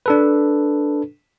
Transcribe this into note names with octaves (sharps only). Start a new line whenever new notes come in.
D4 A4 B4